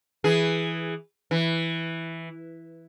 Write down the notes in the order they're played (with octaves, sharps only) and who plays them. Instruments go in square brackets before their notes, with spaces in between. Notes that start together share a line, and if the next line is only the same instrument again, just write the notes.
[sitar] E3 G#4
E3